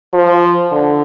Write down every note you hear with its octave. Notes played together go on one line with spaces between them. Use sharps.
F3
D3